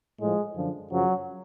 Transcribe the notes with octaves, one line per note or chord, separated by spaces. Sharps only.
A2 F3 G#3
F#2 D3 F3
F#2 C#3 F3 F#3